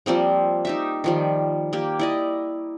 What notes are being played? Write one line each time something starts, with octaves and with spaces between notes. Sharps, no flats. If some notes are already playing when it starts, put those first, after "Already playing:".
F3 G3 A#3 C4
D#4 G4 E5
D#3 F3 G3
A#3 G4
E4 D5 D#5